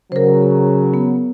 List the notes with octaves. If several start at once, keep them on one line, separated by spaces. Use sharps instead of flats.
C#3 F#3 A#4 C5
B3